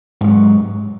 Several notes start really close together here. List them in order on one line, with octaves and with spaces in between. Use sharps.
G#2 F3 F#3